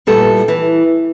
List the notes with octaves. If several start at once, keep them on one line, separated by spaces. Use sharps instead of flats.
A#2 G3 B3 E4 A4
E3